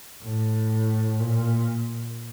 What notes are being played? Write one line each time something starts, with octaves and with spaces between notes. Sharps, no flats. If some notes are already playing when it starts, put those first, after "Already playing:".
A2
A#2